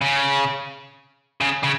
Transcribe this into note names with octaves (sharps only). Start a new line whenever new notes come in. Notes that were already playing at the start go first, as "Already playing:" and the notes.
C#3
C#3
C#3